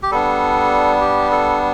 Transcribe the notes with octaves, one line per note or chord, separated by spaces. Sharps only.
G4
G3 B3 D4 A4
G4
A4